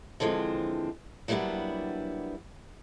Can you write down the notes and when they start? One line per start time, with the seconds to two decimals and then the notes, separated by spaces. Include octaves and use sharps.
0.20 D3 E3 F3 G#3 C4
1.28 F#3 G3 A#3 B3 D4 E4